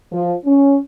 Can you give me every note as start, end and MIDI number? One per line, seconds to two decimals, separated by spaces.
0.12 0.34 53
0.46 0.78 61